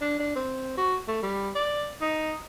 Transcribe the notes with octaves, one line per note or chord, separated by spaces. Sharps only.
D4
D4
C4
F#4
A3
G3
D5
D#4